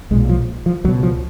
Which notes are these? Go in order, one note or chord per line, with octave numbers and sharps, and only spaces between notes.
B1 A#2 G#3
F3
F3
C#2 B2 F#3
F3